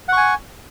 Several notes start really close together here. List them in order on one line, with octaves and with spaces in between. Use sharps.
F#5 C#6 G#5